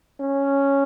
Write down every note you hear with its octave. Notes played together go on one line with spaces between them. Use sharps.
C#4